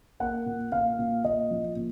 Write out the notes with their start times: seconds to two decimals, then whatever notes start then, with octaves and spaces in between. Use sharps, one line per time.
0.20 A#3 F#5
0.46 A#2
0.72 A#2 F5
0.99 A#2
1.25 A#2 D#5
1.51 F3
1.76 A#2